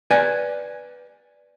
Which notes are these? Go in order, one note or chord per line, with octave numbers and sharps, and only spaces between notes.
B4 D5 G#5